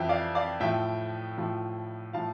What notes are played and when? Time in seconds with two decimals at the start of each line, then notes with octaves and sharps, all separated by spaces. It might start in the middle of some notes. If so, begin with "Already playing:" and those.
Already playing: F2 E3 E5 G5
0.09 D5 F5
0.35 D5 F5
0.60 A2 F3 E5 G5
1.37 A2 F3
2.13 A2 F3 F5 A5